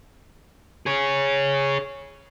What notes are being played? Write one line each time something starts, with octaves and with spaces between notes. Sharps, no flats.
G#4 C#5